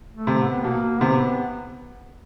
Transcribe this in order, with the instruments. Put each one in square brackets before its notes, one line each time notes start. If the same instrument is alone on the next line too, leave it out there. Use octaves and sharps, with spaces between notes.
[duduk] A3
[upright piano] C3
[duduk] B3
[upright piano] B2 [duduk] A#3
[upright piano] C3 [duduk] B3